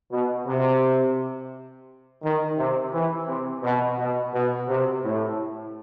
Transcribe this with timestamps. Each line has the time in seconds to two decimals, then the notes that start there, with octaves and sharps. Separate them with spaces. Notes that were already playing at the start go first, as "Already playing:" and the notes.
0.11 B2
0.46 C3
2.22 D#3
2.57 C3
2.93 E3
3.28 C3
3.63 B2
3.98 B2
4.33 B2
4.68 C3
5.03 A2